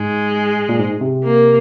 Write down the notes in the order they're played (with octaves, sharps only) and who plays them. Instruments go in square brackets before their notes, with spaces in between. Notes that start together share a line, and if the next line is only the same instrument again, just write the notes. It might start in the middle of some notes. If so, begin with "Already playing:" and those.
Already playing: [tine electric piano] G#2 [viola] G#3
[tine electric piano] A#2
G#2
C3
[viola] A#3